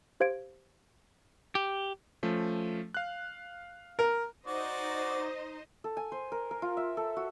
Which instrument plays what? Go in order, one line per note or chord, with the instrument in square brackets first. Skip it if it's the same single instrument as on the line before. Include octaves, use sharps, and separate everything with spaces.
[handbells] G4 C5 F5 G#6 D7
[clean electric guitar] G4
[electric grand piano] F3 A3 C#4
F5 F#6
[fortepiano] A#4
[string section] D#4 C5 D#5 [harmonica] F#4 D5
[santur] A4
G#5
C5
A#4
A#4
F4
E5
A4
F#4